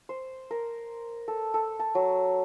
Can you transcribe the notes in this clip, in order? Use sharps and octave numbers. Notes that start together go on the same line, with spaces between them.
C5
A#4
A4
A4
A5
F#3